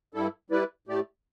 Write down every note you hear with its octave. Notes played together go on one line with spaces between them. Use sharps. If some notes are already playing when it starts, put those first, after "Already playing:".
G2 G3 E4 A4
G3 E4 B4 D5
A2 A3 G4 D5